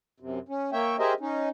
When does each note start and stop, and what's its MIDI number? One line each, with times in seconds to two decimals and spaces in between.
0.20 0.39 42
0.20 0.39 48
0.49 0.70 61
0.73 0.96 58
0.73 0.96 73
0.73 0.96 76
0.73 0.96 79
0.99 1.13 67
0.99 1.13 68
0.99 1.13 70
0.99 1.13 72
0.99 1.13 75
0.99 1.13 76
1.20 1.49 61
1.20 1.49 63